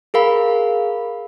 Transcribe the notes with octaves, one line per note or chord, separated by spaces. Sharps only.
G#4 A#4 F5 B5